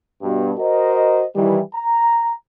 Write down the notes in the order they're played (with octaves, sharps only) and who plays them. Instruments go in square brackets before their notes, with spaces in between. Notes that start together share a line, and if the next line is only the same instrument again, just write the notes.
[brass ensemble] G2 B2
F#4 A#4 C5 D#5
D#3 E3 G3
A#5